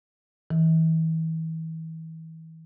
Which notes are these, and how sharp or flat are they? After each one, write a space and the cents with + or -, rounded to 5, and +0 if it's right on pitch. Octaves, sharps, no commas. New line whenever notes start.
E3 -35